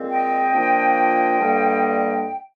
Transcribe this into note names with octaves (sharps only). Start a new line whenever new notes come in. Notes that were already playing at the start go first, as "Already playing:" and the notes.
Already playing: A#2 G#3 C4
D#5 G5
A#2 F3 A#3 D4
G2 D3 G3 A#3 D4